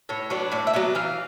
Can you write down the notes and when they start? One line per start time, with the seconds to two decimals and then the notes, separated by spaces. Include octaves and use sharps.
0.09 A2 C#5
0.30 F#3 B3 D4
0.52 A2 D5
0.67 E5
0.73 F#3 B3 D4
0.95 E3 F5